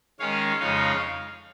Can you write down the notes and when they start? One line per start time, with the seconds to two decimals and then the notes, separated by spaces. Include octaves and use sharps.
0.20 D#3 G#3 C#4 C#5 F5
0.60 F2 C#3 G#3 D#4 C#5 F5